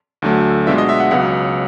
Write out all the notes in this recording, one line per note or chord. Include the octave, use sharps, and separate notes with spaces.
D2 D3 F#3 A3
B2 G#3 B3 D4 F4 E5
D#5
E5
F#5
C#2 C#3 F#3 B3 F#5